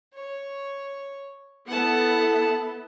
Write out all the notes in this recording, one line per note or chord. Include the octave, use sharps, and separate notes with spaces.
C#5
B3 E4 A4 F#5 A5